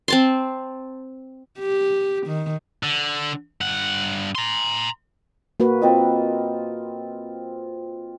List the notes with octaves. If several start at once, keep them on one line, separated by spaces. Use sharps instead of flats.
C4 A5 C6
G4
D#3
D3
G2 F#5
A#5 C6
A#3 F#4 B4
C4 F4 D#5